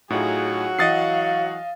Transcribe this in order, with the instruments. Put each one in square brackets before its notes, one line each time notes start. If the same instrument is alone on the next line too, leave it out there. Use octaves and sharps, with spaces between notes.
[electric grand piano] A2 [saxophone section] F#3 F#4 [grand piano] D#4 F4 [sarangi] G#4
[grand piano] E3 D#6 C#7 [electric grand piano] D#5 A6 C7 [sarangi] F5